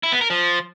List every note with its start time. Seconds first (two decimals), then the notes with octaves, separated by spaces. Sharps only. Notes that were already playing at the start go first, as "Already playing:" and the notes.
0.03 E4
0.12 B3
0.21 A#4
0.30 F3